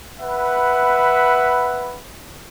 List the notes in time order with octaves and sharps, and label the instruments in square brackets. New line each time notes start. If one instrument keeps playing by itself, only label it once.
[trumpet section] B4 E5 F#5 B5